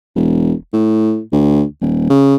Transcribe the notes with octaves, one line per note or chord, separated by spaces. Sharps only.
E1
A2
D2
D#1
C#3